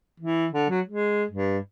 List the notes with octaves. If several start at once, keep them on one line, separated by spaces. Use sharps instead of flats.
E3
D3
F#3
G#3
G2